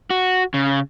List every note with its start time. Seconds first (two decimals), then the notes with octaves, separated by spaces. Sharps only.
0.10 F#4
0.54 C#3